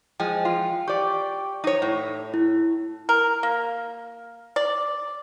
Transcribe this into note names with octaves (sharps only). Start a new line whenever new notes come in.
F3 G#3 G5
F4
G4 D5 C#6
D#4 C#5
A2
E4
A#4
A#3
D5